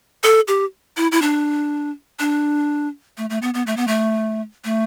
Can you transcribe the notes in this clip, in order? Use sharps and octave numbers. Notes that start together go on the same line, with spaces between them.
A4
G4
E4
E4
D4
D4
A3
A3
B3
B3
A3
B3
A3
A3